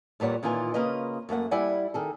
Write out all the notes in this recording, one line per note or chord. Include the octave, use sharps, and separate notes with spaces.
E2 A#2 G3 C#5 F#5
A#2 D#3 E3 F4 G#5
C#3 A#3 F4 B4 D#5
F#2 A3 A#3 F#5
G3 E4 D5 F#5 G#5
D#3 G#4 A4